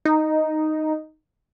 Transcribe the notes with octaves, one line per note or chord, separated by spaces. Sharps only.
D#4